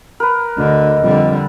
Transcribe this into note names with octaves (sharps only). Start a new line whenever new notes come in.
A#4 B4
D2 D3 D#5
F2 D3 G3